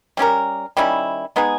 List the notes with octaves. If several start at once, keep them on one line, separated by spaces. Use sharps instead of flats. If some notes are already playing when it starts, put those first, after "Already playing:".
G3 C#4 G4 A#4
D#3 G3 C#4 E4
G#3 B3 D#4 G#4